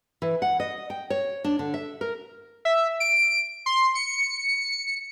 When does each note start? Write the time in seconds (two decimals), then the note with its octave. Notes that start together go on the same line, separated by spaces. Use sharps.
0.22 E3
0.42 F#5
0.60 D#5
0.90 G5
1.10 C#5
1.44 D4
1.59 D3
1.74 E5
2.01 A#4
2.65 E5
3.00 D7
3.66 C6
3.95 C#7